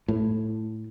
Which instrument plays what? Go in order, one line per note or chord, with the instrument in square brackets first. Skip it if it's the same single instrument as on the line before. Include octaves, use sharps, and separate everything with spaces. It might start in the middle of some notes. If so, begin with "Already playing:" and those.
[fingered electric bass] A2